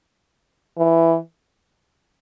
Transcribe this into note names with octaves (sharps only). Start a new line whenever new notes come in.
E3